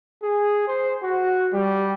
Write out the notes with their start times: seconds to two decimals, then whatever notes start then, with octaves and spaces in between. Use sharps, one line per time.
0.23 G#4
0.67 C5
1.03 F#4
1.53 G3